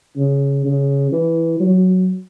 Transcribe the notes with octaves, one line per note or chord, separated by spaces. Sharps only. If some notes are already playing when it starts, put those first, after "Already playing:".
C#3
C#3
E3
F#3